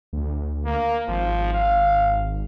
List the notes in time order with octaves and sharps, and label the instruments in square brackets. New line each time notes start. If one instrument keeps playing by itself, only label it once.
[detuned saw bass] D2
[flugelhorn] A#3
[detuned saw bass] G#1 [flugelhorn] F3
[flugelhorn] F5